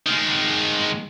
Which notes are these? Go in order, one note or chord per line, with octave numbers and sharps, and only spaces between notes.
D#3 G#3